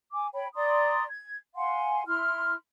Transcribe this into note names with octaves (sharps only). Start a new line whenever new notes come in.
G#5 D6
C#5 G5 B5
D5 A#5 C6 D#6
G#6
F5 F#5 G#5 C6
E4 C6 F6